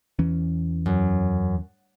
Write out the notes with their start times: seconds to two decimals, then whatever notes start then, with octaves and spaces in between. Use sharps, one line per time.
0.19 E2 E3 C#4
0.86 F#2